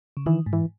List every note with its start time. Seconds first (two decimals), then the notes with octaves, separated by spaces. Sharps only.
0.17 C#3
0.26 D#3 E3
0.46 G#2
0.53 E3